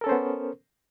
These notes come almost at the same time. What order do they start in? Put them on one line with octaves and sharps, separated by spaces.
A#4 A4 C#4 C5 B3